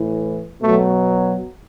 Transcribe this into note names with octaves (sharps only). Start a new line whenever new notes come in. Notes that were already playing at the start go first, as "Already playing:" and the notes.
Already playing: A2 E3
B2 F#3 A3